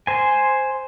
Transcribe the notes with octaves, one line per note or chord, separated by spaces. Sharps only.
C5 G#5